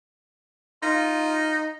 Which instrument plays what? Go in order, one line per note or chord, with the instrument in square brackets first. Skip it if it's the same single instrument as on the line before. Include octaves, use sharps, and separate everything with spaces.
[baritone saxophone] D#4 [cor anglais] F4